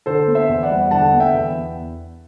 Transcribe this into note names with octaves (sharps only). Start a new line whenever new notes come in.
D3 A4 C5
B3
C5 E5
E2
D5 F#5
G3
D3 F#5 A5
B3
E5 G5
E2